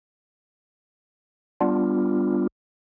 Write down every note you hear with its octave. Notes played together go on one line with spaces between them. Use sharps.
G3 B3 D4 F4